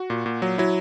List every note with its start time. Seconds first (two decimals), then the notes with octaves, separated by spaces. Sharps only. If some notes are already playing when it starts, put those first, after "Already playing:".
Already playing: F#4
0.10 A#2
0.26 A#2
0.42 F#3
0.58 F#3 E4